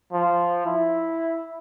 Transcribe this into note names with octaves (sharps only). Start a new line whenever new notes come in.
F3
E4